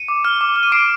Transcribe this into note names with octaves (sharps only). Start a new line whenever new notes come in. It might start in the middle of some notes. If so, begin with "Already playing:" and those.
Already playing: C#7 D#7
D6
F6
D6
F6
D#7
D6 C7 D7